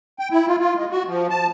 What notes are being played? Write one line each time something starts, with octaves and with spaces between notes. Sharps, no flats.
G5
E4
F4
F4
G#3
F#4
F3
A5